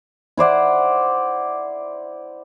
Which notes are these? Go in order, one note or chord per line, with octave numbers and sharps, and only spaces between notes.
E4 C5 D5 F#5